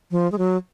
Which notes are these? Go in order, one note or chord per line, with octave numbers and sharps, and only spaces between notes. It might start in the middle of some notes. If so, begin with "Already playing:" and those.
F3
G#3
F#3